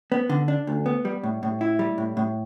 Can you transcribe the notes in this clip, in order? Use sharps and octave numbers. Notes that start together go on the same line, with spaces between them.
B3
D3
D4
D2
B3
G3
A2
A2
E4
G3
A2
A2